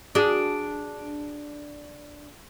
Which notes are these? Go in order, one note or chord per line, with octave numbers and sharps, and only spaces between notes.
D4 F#4 G#4